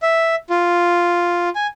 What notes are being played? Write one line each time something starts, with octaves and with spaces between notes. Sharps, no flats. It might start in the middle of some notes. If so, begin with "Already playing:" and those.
E5
F4
G#5